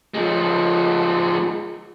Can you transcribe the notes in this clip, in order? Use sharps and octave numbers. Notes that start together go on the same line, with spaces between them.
F3 G#3